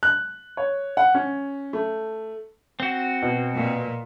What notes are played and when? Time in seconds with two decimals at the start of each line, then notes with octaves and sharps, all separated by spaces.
0.03 F#6
0.57 C#5
0.97 F#5
1.15 C#4
1.73 A3
2.80 C4 F#4
3.22 B2
3.55 A#2